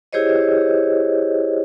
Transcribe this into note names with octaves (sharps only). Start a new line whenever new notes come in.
E4 G4 G#4 C5 C#5 D#5